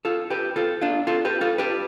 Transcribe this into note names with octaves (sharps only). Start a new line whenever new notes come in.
F4 A4
G4 B4
F4 A4
D4 F4
F4 A4
G4 B4
F4 A4
G4 B4